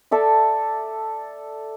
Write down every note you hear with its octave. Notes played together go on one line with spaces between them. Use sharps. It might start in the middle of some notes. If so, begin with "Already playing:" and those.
A4 D5 E5